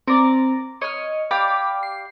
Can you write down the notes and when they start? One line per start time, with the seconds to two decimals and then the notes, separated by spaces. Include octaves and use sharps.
0.07 C4 A#4 D5
0.82 C#5 D#5 F6
1.31 G4 D5 F5 B5
1.83 C7